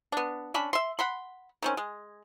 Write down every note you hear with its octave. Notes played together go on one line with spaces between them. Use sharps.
B3 D4
C#4 D4 B5
E5 C6
F#5 B5 C6
D#3 C4 C#4
G#3